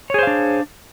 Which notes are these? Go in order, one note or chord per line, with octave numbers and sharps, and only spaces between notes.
D4 G#4 C5 C#5 F5